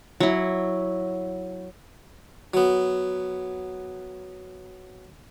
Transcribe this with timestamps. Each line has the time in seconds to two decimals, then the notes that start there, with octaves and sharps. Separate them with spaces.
0.20 F#3 E4
2.54 F#3 B3